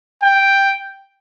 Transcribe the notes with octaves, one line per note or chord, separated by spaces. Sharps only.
G5